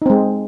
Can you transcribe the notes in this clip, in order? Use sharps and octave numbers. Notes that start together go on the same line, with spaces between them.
G#3 C4 D#4